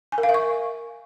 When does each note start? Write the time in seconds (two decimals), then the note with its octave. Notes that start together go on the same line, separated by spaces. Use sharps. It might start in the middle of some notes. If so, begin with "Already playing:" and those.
0.12 G#5
0.18 A#4
0.23 F5
0.29 E5
0.34 C#6